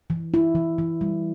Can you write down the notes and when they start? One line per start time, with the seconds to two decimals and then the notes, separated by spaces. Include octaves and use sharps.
0.10 E3
0.34 E4
0.55 E3
0.78 E3
1.01 G3